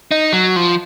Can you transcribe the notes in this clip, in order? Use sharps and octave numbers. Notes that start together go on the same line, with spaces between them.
D#4
F#3
F3